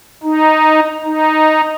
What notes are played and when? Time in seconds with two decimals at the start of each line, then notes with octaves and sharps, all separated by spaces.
0.23 D#4
1.04 D#4